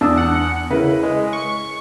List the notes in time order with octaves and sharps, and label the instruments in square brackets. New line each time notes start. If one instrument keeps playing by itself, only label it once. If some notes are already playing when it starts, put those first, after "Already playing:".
[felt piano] E2 D#6 E6 [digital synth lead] D4
[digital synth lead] F#5
[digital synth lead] C#3 [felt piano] E4 A#4 B4
[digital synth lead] G#3
C#6